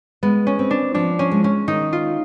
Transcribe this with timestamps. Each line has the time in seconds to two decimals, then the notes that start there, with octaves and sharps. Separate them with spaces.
0.23 G#3 B3
0.47 C#4
0.59 C4
0.71 D4
0.94 F3 D4
1.19 C#4
1.31 G#3
1.44 C#4
1.68 D#3 D#4
1.93 F4